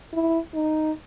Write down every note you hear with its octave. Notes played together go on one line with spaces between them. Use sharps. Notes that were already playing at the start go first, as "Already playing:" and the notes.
E4
D#4